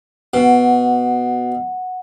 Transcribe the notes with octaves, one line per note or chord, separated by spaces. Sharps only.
B2 F#5